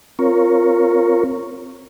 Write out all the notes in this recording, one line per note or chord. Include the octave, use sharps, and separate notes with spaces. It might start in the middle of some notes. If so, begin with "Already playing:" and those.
C4 F4 A#4 C#5